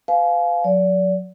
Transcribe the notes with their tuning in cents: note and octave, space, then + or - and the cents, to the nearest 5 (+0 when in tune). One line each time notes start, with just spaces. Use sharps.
B4 +35 F5 +0 G#5 +40
F#3 -30 D5 -30